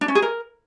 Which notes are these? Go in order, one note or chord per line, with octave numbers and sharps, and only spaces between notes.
D4
C#4
G#4
A#4